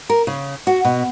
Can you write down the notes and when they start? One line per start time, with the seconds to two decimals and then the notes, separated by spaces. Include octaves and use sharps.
0.10 A#4
0.27 C#3
0.67 F#4
0.85 B2